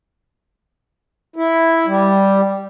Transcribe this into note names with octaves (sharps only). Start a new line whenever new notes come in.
E4
G3